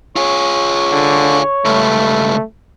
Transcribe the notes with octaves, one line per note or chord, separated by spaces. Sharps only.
F4 G#4 C#5
D3
C#2 G2 A3